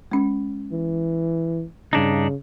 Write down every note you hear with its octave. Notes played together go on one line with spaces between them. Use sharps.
G#3 C#4
E3
G2 C#3 D4 D#4